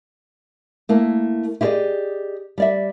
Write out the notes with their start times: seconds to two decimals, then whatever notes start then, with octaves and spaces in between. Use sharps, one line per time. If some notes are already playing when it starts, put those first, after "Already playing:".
0.89 A3 A#3 E4
1.61 E4 G4 G#4 C5 D5 D#5
2.58 G3 D5 E5